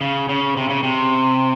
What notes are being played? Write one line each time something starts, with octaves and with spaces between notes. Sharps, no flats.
C#3
C#3
C3
C#3
C3